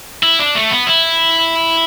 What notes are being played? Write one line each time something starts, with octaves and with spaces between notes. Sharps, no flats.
E4
D4
A3
B3
E4